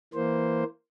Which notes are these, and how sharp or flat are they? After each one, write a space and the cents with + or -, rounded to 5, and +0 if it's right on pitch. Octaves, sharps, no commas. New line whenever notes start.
E3 +0 A#3 +0 C5 +0